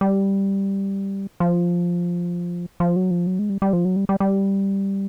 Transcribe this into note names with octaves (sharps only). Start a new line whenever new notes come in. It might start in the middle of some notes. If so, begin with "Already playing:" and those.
G3
F3
F3
F#3
F3
F#3
G#3
G3
G3
F3
F#3
G3
G3
G3